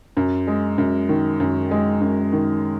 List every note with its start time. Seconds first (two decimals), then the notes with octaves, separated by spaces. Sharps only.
0.17 F#2
0.47 G#3
0.78 F#2
1.09 D#3
1.40 F#2
1.71 G#3
2.01 F#2
2.33 D#3